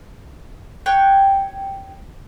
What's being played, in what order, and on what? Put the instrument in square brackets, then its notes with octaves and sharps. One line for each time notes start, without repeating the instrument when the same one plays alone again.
[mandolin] C#5 G5 F#6